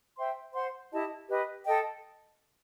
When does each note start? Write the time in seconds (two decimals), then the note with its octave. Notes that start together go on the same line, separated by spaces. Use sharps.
0.17 C5 E5 G5 C6
0.54 C5 F#5 C6
0.91 E4 G4 D#5 A5
1.28 G4 B4 D#5
1.66 A4 D#5 G5